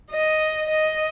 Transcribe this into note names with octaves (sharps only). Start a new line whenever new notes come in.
D#5
D#5